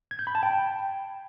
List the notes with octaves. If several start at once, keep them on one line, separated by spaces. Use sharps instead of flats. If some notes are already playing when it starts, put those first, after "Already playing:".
G#6
G6
B5
A5
G5